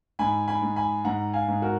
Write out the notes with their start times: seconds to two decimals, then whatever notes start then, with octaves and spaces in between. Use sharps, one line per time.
0.19 G#2 G#5 B5
0.48 G#5 B5
0.62 G#2
0.76 G#5 B5
1.05 G#2 F#5 A#5
1.33 F5 G#5
1.48 G#2
1.62 F#4 A#4